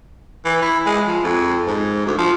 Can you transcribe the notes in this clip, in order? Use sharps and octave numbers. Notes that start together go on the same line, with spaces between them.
E3
E4
G#3
F3
F2
G#2
D2
F3